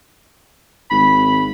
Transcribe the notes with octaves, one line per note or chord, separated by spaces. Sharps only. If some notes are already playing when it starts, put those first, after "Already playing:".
G#1 B5